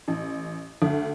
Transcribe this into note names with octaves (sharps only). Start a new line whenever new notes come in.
A1
D2